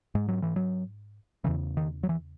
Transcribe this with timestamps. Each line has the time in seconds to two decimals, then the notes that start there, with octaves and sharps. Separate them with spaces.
0.15 G#2 G#3
0.28 F#3
0.42 E3
0.56 F#3
1.44 E2 C#3 E3
1.77 D#3
2.03 F#3
2.09 E3